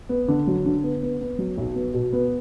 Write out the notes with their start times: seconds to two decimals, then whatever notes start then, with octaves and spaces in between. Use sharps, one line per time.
0.09 B3
0.28 D3
0.47 F#3
0.66 D3
0.83 B3
1.03 B3
1.21 B3
1.39 F#3
1.58 B1
1.75 B3
1.94 B2
2.13 B3